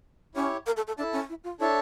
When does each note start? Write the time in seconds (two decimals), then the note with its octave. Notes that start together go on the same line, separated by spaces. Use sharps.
0.35 C#4 E4 G4 C#5
0.66 A#4
0.77 A4
0.87 A4
0.98 D4 E4 A4 E5 A5
1.13 C#4
1.29 E4
1.44 F4
1.60 D4 E4 A4 C#5 E5 A5